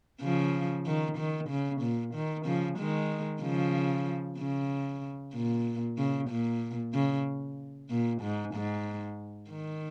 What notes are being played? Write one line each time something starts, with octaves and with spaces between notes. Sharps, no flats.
C#3 F3
D#3
D#3
C#3
A#2
D#3
C#3 F3
D#3 G#3
C#3 F3
C#3
A#2
C#3
A#2
C#3
A#2
G#2
G#2
D#3